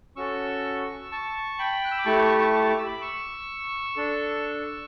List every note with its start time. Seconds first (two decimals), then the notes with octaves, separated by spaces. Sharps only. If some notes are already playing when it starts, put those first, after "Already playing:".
0.16 C#4 F#4 A4 C#6 E6
1.11 A5 C#6
1.59 G5 B5
1.85 F#6
1.92 E6
1.99 D6
2.06 A3 E4 G4 A5 C#6
2.38 A5 C#6
2.69 D6
2.78 E6
2.86 B5 D6
3.01 C#6 E6
3.97 D4 A4